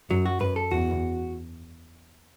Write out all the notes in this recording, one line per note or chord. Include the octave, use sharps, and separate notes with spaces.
F#2 F#3
F#4
F#2 B4
A4
E2 F#4